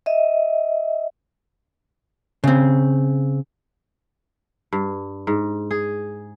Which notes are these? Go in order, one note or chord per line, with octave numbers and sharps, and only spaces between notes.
D#5 E5
C#3 C4
G2
G#2
G#4